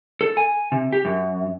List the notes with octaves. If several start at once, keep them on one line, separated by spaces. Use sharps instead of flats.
A4
G#5
C3
G4
F#2